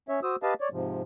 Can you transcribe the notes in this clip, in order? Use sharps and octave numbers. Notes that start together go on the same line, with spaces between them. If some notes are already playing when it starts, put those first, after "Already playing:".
C#4 C#5 E5
F#4 C5 D#6 E6
G4 B4 D#5 F5 A5
C#5 D5
G#2 C3 F3